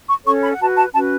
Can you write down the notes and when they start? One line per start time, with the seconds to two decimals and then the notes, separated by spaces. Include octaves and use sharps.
0.09 C#6
0.26 C#4 A4 C#5 C#6
0.43 B5
0.52 F#5
0.60 F#4 B4 A5
0.76 A5
0.93 C#4 F#4 B4 A5